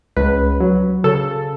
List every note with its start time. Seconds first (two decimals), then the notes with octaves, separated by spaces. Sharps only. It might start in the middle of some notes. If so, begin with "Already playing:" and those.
0.16 C#2 B4
0.60 F#3
1.04 C#3 A4